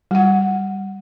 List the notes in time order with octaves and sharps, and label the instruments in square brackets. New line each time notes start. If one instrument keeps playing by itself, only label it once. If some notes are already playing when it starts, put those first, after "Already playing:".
[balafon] G3 F#5